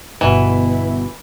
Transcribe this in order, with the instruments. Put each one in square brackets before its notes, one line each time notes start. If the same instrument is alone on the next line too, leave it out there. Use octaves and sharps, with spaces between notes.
[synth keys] G1 B2 [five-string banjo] E3 [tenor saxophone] E4 [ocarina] B4